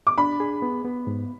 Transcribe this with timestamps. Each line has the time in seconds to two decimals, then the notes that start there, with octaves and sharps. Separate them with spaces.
0.07 D6
0.18 D4 B5
0.40 G#4
0.62 B3
0.84 B3
1.07 G#2